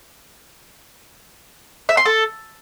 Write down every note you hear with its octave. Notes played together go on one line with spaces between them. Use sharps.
E5
C6
A4